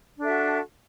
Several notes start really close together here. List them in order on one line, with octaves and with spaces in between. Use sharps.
D4 A4 E5 F#4